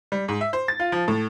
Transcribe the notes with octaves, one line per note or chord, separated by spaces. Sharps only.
G3
G#2
E5
C5
A6
F4
F3
A2